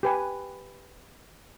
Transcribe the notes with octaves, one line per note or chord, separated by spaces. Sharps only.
G4 B4 G#5